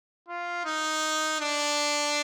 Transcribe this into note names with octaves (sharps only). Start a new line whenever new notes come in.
F4
D#4
D4